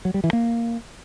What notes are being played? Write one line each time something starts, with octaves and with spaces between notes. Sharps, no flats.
F#3
G3
E3
A#3